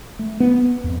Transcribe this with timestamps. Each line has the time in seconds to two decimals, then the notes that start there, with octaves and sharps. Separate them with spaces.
0.19 A3
0.40 B3
0.84 F2